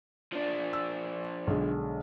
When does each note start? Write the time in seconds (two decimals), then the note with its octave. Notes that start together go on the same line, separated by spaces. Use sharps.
0.32 F3 D4
0.73 E6
1.47 B1 D3 G#3